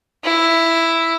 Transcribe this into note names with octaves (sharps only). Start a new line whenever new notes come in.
E4